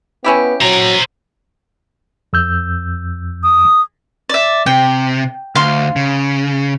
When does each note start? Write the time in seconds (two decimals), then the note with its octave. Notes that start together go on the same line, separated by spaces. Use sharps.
0.24 B3 C#4 E4 G4
0.61 F#3 C5 A#5
2.33 F2 E6 G6
3.43 D#6
4.29 D5 E5
4.66 C3 G5
5.55 D2 F5 C6
5.96 C#3